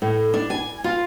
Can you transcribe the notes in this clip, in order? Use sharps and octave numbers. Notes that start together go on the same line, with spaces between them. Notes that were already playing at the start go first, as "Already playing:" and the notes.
A2
D4
G#5
F4